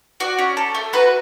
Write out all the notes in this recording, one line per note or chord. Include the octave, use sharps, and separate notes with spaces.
F#4 D5
C#4
A4
A3
F#4 B4